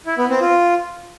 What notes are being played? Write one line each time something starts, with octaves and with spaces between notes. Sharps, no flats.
E4
B3
C4
F4